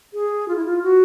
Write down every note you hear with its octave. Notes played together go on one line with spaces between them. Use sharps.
G#4
F4
E4
F4
F#4